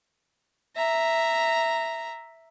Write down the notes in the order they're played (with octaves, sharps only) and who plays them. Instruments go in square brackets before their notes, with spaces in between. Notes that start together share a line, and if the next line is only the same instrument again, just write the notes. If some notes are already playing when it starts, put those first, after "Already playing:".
[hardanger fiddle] E5 A#5